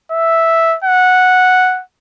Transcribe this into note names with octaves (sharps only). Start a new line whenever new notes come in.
E5
F#5